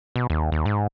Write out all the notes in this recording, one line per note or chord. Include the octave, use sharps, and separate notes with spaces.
B2
D#2
D#2
G#2